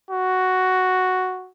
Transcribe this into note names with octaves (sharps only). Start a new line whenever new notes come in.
F#4